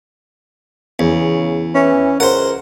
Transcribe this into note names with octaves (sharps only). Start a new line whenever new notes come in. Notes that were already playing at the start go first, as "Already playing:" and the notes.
E2 C#3
E3 C#4
C#2 A#4 C5 F#5